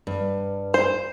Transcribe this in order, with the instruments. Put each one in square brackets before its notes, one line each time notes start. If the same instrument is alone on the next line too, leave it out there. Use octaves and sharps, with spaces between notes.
[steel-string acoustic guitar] G2
[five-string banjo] C5